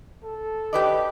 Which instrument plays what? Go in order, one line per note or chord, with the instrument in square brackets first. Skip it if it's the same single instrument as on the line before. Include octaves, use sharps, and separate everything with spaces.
[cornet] A4
[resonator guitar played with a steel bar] G4 B4 D5 [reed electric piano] D#5